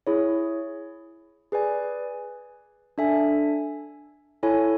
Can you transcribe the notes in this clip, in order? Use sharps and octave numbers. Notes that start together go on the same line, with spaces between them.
E4 G#4 C#5
G#4 B4 D5 G#5
D4 A4 E5 G#5
E4 A4 C#5 G#5